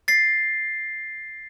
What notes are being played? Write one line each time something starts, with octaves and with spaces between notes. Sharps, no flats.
A6 C7